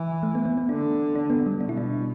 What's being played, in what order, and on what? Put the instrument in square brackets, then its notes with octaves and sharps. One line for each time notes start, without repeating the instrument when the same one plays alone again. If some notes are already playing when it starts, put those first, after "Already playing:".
Already playing: [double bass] E3
[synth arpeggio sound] A3
B3
B3
B3
[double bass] D3 [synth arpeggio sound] D4
[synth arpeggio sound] D4
B3
G3
[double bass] B2 [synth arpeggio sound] D4
[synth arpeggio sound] E4
D4